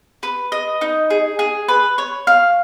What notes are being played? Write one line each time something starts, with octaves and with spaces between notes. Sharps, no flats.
B4
D#5
D#4
G#4
G#4
B4
C#5
F5